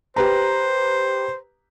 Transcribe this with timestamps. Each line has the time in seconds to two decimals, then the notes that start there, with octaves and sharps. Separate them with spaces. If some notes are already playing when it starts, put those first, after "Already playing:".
0.16 G4 B4 C5 A#5